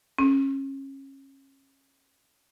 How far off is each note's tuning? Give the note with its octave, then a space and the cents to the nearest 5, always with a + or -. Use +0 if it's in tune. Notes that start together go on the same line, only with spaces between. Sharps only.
C#4 -30